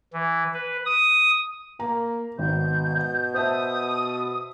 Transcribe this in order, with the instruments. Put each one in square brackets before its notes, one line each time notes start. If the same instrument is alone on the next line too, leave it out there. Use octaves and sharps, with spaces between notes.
[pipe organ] E3
B4
D#6
[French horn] A#3 [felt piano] A#5
[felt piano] G#1 [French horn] B2 [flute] G6
[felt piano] C5 E5 A5 [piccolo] D#6